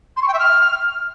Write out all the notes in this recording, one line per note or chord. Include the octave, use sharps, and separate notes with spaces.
C6
C#6
G5
E5
F6